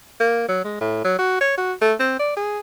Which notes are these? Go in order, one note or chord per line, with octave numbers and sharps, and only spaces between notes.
A#3
F#3
G#3
A2
F#3
F#4
C#5
F#4
A3
C4
D5
G#4